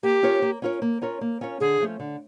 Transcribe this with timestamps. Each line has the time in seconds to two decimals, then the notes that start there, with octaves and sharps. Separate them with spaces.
0.03 A#3 G4
0.23 C#4 F4 A#4 C#5
0.42 A#3
0.62 C#4 F4 A#4 C#5
0.82 A#3
1.02 C#4 F4 A#4 C#5
1.21 A#3
1.41 C#4 F4 A#4 C#5
1.60 D3 G#4
1.80 F3 A3 C#4
2.00 D3